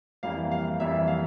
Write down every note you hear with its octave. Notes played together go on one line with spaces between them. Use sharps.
F2 E3 G3 A#3 F5
F5
F2 E3 G3 A#3 E5
F5